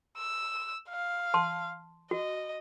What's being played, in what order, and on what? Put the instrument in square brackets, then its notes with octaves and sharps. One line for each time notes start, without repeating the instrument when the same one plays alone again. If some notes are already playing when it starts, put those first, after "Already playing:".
[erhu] E6
F5
[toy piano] A5 C6
[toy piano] F#4 [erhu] D#5